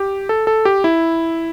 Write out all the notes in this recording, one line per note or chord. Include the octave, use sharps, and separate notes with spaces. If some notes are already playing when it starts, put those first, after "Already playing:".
Already playing: G4
A4
A4
G4
E4